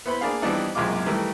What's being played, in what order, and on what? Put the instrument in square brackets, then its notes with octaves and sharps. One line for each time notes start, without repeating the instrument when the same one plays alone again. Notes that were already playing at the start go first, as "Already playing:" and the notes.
[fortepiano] B3 E4 B4 C5 B5
A#3 D4 G#4 F5
E3 F3 G3 B3 D4 D#4
C2 F#2 A#2 G#3 F4 D6
D#3 E3 G3 A3